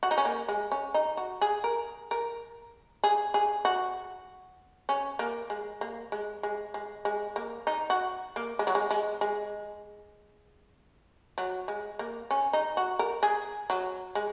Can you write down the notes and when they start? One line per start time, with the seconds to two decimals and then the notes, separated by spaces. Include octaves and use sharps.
0.03 F#4
0.11 D#4
0.18 C#4
0.25 A#3
0.48 G#3
0.72 C#4
0.94 D#4
1.17 F#4
1.41 G#4
1.64 A#4
2.11 A#4
3.04 G#4
3.34 G#4
3.65 F#4
4.89 C#4
5.19 A#3
5.50 G#3
5.81 A#3
6.12 G#3
6.43 G#3
6.74 G#3
7.05 G#3
7.36 A#3
7.67 D#4
7.90 F#4
8.36 A#3
8.59 G#3
8.67 F#3
8.75 G#3
8.91 G#3
9.21 G#3
11.38 F#3
11.68 G#3
11.99 A#3
12.31 C#4
12.53 D#4
12.77 F#4
12.99 A#4
13.23 G#4
13.70 F#3
14.15 G#3